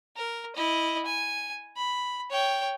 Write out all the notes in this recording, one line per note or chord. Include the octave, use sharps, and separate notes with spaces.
A#4
E4 D#5
G#5
B5
C#5 G5